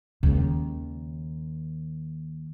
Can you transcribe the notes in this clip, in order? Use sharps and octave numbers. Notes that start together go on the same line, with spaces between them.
D#2 C#3 G#3